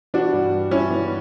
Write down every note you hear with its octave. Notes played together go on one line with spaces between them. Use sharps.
E3 D4 F#4
G2
G3
G2 C#4 E4
E3